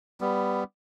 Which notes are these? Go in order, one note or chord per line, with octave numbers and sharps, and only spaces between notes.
G3 B3